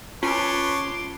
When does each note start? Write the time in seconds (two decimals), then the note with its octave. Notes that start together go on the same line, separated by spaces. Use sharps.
0.23 C#4 F4 B4 C#5 A5 C6 D6